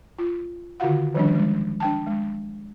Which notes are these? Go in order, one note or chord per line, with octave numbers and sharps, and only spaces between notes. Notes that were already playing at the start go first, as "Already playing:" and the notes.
F4
D3 D#3 F4 F#4 F5 F#5
D#3 F3 G3 C#4 D4
G#3
D4 G5 A5
G#3